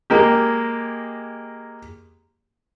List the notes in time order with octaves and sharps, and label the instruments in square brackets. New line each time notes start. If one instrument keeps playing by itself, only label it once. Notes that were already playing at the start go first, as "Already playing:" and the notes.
[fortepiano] G#3 A#3 G4